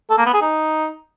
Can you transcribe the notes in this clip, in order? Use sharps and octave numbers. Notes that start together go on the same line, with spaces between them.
A4
A#3
B3
G#4
D#4